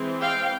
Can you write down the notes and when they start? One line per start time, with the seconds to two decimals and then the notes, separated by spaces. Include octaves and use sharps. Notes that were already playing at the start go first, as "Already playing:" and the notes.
Already playing: E3 G#3 C4
0.21 F5 G5